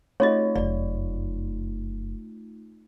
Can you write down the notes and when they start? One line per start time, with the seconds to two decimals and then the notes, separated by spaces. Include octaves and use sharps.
0.20 A3 D#4 F4 C#5 D#5
0.55 F1 F#2 D5